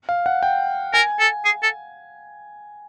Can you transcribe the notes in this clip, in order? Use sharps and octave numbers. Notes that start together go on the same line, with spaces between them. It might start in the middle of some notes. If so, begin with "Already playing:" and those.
F5
F#5
G5
A#4 G#5
A4
G#4
A4